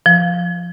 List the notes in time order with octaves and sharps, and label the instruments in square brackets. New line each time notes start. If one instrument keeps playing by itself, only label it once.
[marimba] F3